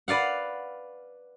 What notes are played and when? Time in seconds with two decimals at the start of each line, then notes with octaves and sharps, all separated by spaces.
0.08 B4 D5 F5 F#5